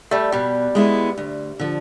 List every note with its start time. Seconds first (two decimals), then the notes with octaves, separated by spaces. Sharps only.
0.11 G3 A3
0.32 B2 G3
0.75 G#3 B3 E4
1.17 D2
1.60 D3 F3